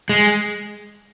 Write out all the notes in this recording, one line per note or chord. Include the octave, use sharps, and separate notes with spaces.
G#3